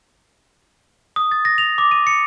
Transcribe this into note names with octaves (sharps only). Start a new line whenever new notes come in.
D#6
A6
A#6
F7
D6
D#7
C#7